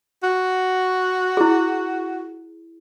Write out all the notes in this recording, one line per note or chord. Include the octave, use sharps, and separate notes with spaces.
F#4
E4 G#4